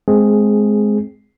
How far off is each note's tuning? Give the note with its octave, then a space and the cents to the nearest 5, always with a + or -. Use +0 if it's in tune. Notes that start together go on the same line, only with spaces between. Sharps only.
G#3 +20 C4 +0 G#4 +0